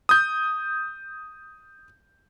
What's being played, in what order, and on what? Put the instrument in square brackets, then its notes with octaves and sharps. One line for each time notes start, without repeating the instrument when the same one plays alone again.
[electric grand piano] D#6 G6